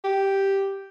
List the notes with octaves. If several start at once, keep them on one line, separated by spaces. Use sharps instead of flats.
G4